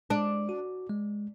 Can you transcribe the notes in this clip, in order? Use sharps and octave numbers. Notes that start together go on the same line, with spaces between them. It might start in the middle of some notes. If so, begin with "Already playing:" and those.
G#3 D4
F#4
G#3